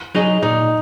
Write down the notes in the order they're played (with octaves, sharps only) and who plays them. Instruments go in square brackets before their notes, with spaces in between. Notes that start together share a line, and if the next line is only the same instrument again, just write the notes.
[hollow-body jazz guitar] F#3 D#4 G#4 D#5
[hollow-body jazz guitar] A#2 [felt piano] D#4